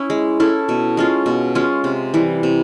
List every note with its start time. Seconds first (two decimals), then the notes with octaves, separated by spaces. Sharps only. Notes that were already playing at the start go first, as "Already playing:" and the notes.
Already playing: C#4 E4
0.10 G#3
0.40 C#4 E4 A4
0.69 B2
0.97 G#3 C#4 F4
1.26 B2
1.55 G#3 C#4 F4
1.84 C3
2.14 E3 G3
2.43 C3